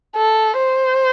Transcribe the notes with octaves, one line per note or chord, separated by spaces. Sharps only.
A4
C5